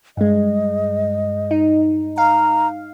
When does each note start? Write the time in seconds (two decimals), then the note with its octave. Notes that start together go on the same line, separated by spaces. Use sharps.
0.17 G2 G#3 D#5
1.51 D#4
2.18 F5 A#5